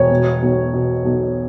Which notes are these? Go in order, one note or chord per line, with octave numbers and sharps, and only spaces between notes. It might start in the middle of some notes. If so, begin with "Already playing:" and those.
Already playing: E1 C#5
B2
B1
B2
B1